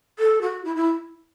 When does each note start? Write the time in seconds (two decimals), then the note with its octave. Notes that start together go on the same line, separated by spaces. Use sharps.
0.19 A4
0.41 F#4
0.65 E4
0.76 E4